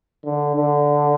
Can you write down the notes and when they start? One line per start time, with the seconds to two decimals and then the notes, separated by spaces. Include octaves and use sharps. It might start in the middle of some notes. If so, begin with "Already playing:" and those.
0.25 D3
0.56 D3